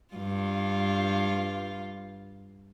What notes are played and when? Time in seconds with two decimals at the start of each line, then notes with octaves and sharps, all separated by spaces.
0.15 G2 F4